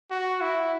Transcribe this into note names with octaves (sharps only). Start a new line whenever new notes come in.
F#4
E4